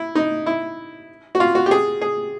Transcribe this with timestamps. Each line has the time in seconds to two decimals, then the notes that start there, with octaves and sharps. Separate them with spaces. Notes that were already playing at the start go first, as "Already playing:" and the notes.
Already playing: E4
0.15 D#4
0.46 E4
1.35 F#4
1.40 F4
1.55 F#4
1.66 G4
1.71 G#4
2.01 G#4